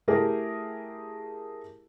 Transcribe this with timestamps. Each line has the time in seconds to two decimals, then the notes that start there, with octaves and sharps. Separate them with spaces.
0.08 A3 E4 G4 G#4 A#4